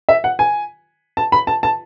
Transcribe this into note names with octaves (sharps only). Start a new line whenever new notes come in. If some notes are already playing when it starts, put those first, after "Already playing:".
E5
F#5
G#5
A5
B5
A5
A5